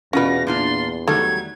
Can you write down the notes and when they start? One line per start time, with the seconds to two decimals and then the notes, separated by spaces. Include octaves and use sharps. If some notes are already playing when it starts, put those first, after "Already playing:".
0.13 E2 B2 C#4 F4 F#4 B4 A#6
0.47 A#2 D4 F4 C6
1.07 D#3 F#3 G3 A3 G#6